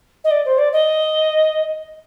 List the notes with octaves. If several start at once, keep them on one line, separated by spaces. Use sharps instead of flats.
D#5
D5
C5
D5
D#5